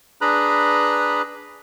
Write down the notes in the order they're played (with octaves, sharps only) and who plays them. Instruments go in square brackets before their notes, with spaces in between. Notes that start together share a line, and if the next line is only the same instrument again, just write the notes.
[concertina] D4 G#4 B4 A#5 B5 F#6